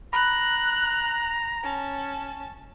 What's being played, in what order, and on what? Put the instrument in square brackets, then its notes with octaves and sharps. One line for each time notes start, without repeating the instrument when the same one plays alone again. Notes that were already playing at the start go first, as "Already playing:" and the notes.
[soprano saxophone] A#5 [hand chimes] B5 [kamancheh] F#6
[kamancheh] C#4 A5